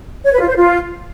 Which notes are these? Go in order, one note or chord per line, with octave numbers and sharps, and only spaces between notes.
C#5
B4
F4
C5
F4